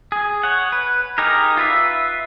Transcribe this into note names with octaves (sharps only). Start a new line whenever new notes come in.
G#4
C#5 F#5
B4
D#4 G4 G#4 A#4
F4 B4 E5